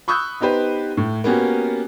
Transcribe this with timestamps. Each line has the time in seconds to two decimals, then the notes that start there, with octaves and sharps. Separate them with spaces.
0.08 B5 C#6 D#6 E6 F#6 G6
0.40 B3 D#4 G4 B4 C5
0.97 A2
1.24 A#3 B3 C#4 F#4 G4